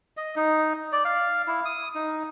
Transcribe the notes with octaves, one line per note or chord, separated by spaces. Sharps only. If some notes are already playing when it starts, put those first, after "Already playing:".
D#5
D#4
D5
F5
E4
D#6
D#4